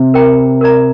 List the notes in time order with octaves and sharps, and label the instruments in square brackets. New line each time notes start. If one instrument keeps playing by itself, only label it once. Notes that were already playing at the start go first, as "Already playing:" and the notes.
Already playing: [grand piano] C3
[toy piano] A#4 G5 A#5
A#4 D5 A#5